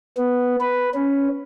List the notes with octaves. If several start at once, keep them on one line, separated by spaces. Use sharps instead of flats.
B3
B4
C#4